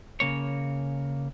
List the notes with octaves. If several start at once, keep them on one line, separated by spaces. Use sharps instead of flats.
C#3 A#3 C#5